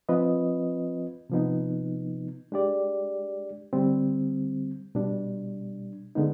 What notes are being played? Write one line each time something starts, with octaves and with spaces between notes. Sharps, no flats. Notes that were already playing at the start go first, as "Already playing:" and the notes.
F3 C4 F4 B4 D#5
C3 F3 B3 D#4
G#3 D4 G4 D5
D3 G3 C4
B2 G3 D4
D3 G#3 B3 D#4